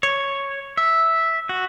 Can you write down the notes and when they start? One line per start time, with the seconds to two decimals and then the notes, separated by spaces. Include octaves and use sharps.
0.03 C#5
0.77 E5
1.49 F#4